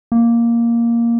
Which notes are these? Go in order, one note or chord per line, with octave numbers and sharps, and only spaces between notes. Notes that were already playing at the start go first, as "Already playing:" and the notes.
A#3